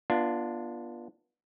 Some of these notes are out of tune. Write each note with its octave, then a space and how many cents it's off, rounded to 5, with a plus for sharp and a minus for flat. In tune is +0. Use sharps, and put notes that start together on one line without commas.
B3 -35 D4 +10 F4 -15